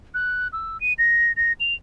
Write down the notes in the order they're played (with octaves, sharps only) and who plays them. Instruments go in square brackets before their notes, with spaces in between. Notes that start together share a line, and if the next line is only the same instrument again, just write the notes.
[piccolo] F#6
E6
D#7
A#6
A#6
F7